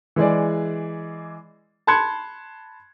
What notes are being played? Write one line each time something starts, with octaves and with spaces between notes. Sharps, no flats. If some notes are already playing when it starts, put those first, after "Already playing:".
E3 G#3 G#4 D5
A5 B5 C6 F#6 G#6 C#7